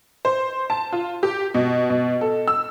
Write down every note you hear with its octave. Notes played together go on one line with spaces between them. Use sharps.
C5
A5
F4
G4
B2
B2
A4
E6